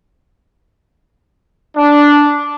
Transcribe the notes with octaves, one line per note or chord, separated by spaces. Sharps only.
D4